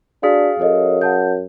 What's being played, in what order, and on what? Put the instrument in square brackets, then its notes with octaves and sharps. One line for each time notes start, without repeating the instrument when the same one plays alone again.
[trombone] D4 [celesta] F#4 B6 [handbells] G#4 F5
[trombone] F#2 [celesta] A4 C#5 D#5
[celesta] F#5 A5 G6